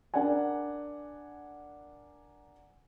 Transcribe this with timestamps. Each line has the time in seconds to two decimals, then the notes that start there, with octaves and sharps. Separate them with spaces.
0.14 D4 A#4 D5 F#5 G#5